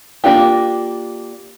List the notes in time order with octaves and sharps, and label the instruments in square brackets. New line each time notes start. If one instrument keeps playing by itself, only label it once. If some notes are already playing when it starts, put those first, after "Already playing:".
[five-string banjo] A#3 D4 F4 G4